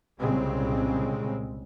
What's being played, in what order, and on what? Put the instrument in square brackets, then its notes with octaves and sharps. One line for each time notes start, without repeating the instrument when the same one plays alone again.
[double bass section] C2 A#2 C#3 G#3 C4